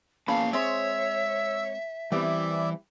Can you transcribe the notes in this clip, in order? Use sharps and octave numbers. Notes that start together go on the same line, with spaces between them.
E2 A#3 C#4 F5 A5 B5
G#3 C4 C5 C#5 E5 E6
E3 G3 B3 C4 D5 E5